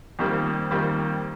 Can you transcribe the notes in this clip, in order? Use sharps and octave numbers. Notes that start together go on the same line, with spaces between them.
F2 D#3 G3 A#3
F2 D#3 G3 A#3